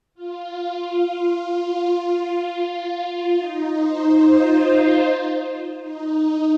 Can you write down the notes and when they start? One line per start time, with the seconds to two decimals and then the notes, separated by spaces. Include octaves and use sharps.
0.15 F4
1.77 F4
2.58 F4
3.39 D#4
3.80 C5
4.20 F4
5.82 D#4